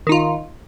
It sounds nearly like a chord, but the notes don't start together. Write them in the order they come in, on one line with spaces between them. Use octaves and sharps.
D#3 D#4 F4